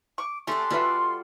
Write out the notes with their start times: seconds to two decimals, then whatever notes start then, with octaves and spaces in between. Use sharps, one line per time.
0.18 C#6 D6
0.47 A3 C#4 D4 G4 A4 C6
0.70 G3 F4 F#4 A4 B4 E5